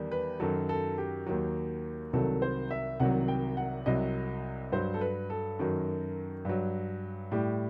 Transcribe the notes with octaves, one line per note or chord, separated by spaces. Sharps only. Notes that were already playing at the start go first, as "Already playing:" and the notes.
Already playing: E2 D#3 G3
B4
F#2 D#3 F#3 A4
A4
G4
D#2 D#3 F#3
C2 C3 D#3 F#3 A4
C5
E5
C2 C3 D#3 F#3 F#5
G5
F#5
C2 C3 F#3 D#5
G2 F#3 C5
A4
B4
A4
F#2 D#3 F#3
G2 F#3
A2 G3 G4